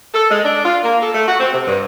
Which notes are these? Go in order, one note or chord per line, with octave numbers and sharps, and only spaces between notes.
A4
G#3
D4
F4
A#3
A4
A3
F#4
C4
C3
G2